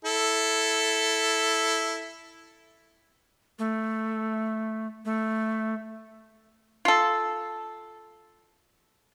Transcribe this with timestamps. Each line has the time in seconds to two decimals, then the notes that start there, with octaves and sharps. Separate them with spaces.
0.05 E4 A4
3.59 A3
5.05 A3
6.85 F4 A4